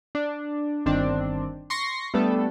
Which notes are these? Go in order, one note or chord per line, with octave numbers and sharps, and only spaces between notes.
D4
G1 D#3 C4 D4
C6 C#6 A#6 C7
G3 A3 B3 D4 A4